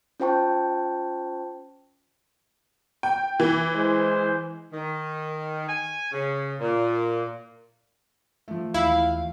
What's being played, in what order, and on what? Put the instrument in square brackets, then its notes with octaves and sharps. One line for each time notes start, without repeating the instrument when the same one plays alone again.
[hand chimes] C#4 F4 C5 G5 A5 C#6
[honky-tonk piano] G5
E3
[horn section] G#3 C5
D#3
G#5
C#3
A#2
[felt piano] F3 A3
[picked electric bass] D#2 E3 [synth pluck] E4 [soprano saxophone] F5